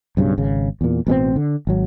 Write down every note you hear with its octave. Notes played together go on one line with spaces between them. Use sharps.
B1 G2 C#3
G#1 C#3
E2 A#2
A1 B2 G3 C4
D3
G#1 F#3